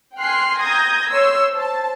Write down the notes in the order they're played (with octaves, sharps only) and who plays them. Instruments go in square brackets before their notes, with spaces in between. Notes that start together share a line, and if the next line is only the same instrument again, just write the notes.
[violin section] G5 G#5 C6 F6 F#6 C7
A#5 D#6 G6 G#6 A#6
C#5 C6 E6
C5 A5